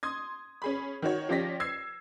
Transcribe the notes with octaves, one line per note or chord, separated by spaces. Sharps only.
C6 D#6 G#6
C#4 G#4 B5
D#3 F#4 C#5
F3 C#4 G4 D5 A#6 B6
E6 G#6 C7